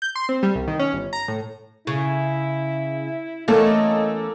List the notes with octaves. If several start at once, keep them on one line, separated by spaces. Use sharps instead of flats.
G6
C6
C4
G3
C2
D#3
C#4
G1
A#5
A2
C#3 E4
E2 A3 A#3 C#4 A4 C#5 D#5